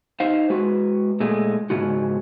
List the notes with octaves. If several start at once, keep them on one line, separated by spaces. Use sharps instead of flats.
D#4 C5 D#5 F5
G#3 F#4 B4
A#2 G#3 A3
G#2 C#3 G#3 F4 F#4